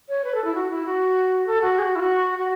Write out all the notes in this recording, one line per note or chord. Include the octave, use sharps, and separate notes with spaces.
C#5
B4
A4
E4
F#4
E4
F#4
A4
F#4
G#4
F#4
E4
F#4
F#4